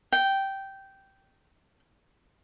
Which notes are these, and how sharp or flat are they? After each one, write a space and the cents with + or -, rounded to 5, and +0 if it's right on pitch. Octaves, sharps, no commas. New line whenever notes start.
G5 -10